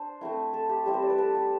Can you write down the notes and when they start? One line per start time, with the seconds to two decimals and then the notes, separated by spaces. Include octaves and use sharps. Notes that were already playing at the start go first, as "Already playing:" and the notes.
Already playing: D4 C5
0.21 A3 C4 E4
0.53 A4
0.69 G4
0.86 G3 C4 E4 G4
0.94 C5
1.02 D5
1.10 B4
1.18 A4
1.35 G4